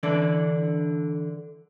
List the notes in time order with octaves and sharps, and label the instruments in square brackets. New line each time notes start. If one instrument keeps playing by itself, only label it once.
[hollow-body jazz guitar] D3 E3 D4 E4